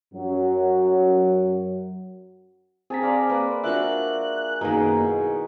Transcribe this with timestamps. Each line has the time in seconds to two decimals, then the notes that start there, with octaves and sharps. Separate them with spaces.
0.14 F#2 F#3
2.90 C4 G#4 A5 A#5 B6
3.02 C5 D5 F5 A#5
3.29 A#3 B4
3.64 D4 F4 F#4 A#4 E5 F#6
4.61 F#2 B2 D#3 A#3 D#4 G#4
4.99 E4